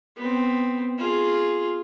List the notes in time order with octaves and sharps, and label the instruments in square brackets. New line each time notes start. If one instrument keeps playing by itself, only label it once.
[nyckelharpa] B3 C4
F4 G#4